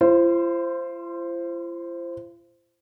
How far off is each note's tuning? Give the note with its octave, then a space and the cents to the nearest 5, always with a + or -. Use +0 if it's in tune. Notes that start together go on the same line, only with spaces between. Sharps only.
F4 -45 C5 +0